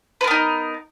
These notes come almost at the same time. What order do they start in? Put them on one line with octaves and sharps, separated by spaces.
B4 A#4 B3 D#4